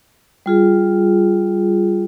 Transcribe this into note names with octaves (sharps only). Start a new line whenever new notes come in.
G3 F4 G#4